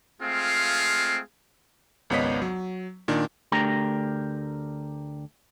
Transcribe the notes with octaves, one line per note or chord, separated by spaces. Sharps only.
G#3 A3 C4 F4 G#4 F5
G#1 C#2 B3 C#5 D#5 B6
F#3
A#2 D#3 D4
D2 A3 D4 G4 A#4 A#5